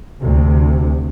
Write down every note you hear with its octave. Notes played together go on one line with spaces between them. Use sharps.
D2 C3